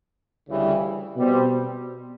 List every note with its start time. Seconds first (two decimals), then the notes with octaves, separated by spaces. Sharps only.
0.48 D2 C#3 E3 G3
1.17 B2 G3 C4